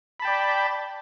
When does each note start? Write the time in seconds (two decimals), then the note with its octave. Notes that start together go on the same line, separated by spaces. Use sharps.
0.20 B5
0.22 A5
0.25 G5
0.27 D5